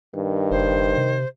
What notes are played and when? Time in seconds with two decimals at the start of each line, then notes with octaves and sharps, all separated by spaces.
0.15 G2 D#3
0.51 F#1 C5
0.97 C3